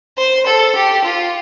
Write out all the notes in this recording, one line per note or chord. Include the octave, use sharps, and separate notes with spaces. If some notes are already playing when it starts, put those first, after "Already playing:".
C5
A4
G4
F4